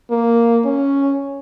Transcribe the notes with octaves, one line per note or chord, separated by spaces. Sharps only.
A#3
C#4